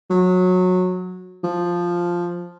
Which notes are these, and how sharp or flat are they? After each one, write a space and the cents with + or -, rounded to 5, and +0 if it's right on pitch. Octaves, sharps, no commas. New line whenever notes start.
F#3 -20
F3 +0